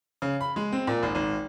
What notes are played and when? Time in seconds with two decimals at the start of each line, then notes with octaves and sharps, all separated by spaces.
0.22 C#3
0.41 B5
0.56 G#3
0.72 C4
0.87 A#2
1.03 G#1
1.15 G#1